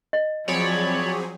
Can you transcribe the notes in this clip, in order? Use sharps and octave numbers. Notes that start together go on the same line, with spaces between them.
D#5
F3 F#3 C4 G#4 C#5 D5 B5